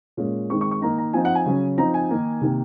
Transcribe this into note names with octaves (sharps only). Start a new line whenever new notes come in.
A#2 G#3 C#4
D#3 G#3 C4 C#6
C#6
C#6
D#3 A#3 D#4 A#5
A#5
F3 C4 D#4 G#5
F#5
G#5
C#3 F#3 C#4
F3 C4 D#4 A#5
G#5
D#3 A#3 D#4
C3 D#3 A#3